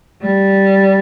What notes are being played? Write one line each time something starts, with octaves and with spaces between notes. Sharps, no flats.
G3